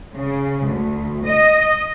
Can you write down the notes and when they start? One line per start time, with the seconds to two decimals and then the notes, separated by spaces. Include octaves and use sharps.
0.14 C#3
0.66 D2
1.25 D#5